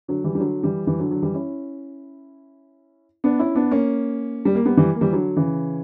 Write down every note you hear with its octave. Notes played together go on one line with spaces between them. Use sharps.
D3 F#3
E3 G3
G3
D3 F#3
E3 G3
E3 G3
D3 F#3
D3 F#3
E3 G3
C#4 E4
B3 D4
C#4 E4
B3 D4
A#3 C#4
G3
A#3
G3 B3
E3 G3
A#3
E3 G3
D3 F#3
C#3 E3